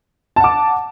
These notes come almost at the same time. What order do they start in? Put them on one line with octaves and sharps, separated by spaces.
A5 F#5 D6